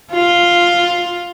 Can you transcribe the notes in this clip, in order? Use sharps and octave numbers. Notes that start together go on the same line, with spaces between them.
F4